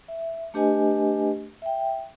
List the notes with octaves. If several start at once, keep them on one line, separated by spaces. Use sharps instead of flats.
E5
A3 D4 G4 B4 D#5 G#5
E5 G5